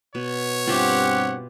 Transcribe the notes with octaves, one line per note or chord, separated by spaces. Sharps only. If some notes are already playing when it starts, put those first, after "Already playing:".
B2 C#5
G2 C4 F4 G4 E5 F#5